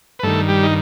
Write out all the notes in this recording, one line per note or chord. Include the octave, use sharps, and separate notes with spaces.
B4
G2 D#3 A3 A4
G3 G4
D#4